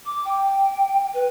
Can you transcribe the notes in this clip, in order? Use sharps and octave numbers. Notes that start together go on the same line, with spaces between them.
D6
G5
B4